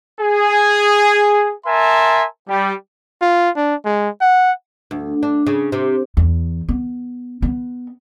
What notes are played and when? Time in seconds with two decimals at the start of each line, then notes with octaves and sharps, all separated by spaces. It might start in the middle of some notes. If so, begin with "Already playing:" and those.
0.21 G#4
1.66 A#4 E5 G#5 A5 C6
2.49 G3
3.22 F4
3.57 D4
3.85 G#3
4.21 F#5
4.91 D2
5.23 D4
5.46 C#3
5.72 C3
6.17 E2
6.69 B3
7.42 B3